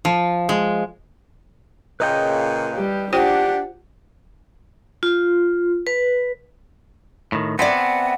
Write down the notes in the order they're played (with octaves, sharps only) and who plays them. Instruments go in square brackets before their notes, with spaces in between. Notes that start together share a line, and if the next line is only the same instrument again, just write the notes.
[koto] F3
G#3
[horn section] A#2 C#3 [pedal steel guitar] B4 D#5 G5
[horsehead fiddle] G3 G4
[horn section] D4 [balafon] F4 C5 G5 [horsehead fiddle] G4 F#5
[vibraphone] F4
B4
[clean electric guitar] A2 D#3
[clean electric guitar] B3 C4 [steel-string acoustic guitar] D5 E5 G#5 [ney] F#5